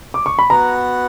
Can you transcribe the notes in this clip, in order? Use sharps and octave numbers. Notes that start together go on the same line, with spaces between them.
D6
C#6
B5
B3 F#4 B4 F#5 A#5